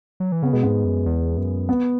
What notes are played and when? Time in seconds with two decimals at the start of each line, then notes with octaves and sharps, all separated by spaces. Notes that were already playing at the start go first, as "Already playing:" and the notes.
0.20 F#3
0.32 E3
0.42 C#3 B3
0.53 B2 G#3
0.63 G#2 B3
0.85 F#2
1.06 E2
1.37 F#2
1.69 B3